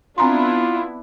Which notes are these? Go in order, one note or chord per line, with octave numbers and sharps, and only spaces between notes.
B3 C4 D4 E4 F4 A#5 C6